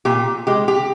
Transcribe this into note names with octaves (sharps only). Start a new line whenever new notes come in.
A#2 G4
G#3 G4
G4